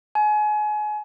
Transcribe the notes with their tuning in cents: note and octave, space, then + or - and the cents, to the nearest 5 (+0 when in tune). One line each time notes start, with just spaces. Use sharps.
G#5 +30